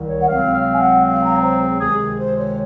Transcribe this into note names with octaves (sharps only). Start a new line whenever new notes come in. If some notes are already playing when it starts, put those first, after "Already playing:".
Already playing: C2 D#3
C#5
F#5
C#2 C3 F#3 C4 F5
F5
G#5
F#5
F5
A#5
C#5
C5
G#4
C#2 C3 D#3 G#3 G#4
G#4
C5
C#5